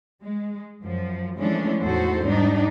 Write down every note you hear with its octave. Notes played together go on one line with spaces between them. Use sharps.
G#3
F#2 F3
E3 F3 G#3 A3 C#4 D4
E2 A2 D#4 F#4 A4 C5
G#2 G3 D4 D#4